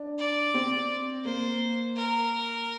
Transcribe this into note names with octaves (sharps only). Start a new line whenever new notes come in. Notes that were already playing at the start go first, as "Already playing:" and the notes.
Already playing: D4
D5
C4
A#3 C5
A#4